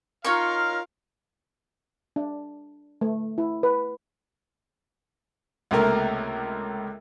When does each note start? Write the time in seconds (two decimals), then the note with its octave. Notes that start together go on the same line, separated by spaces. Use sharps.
0.25 D#4 F4 A#4 C#5 F5 C#6
2.16 D4
3.01 A3
3.38 E4
3.63 B4
5.71 C#2 C3 A3 A#3 A#4